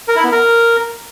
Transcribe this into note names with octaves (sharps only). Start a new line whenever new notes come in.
A#4
E4
B3
A#4